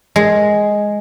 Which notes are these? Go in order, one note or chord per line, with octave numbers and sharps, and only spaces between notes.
G#3